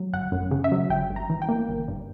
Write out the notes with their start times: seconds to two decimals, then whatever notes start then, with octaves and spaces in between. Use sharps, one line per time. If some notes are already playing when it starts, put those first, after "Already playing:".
Already playing: F#3
0.13 G1 F#5
0.32 F#2
0.51 C#3
0.64 E5
0.72 F#3
0.90 G1 G5
1.10 G2
1.16 A#5
1.30 E3
1.42 G5
1.49 A#3
1.69 G1
1.88 G2